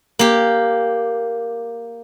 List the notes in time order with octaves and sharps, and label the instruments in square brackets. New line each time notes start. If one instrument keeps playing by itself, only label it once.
[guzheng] A#3 G4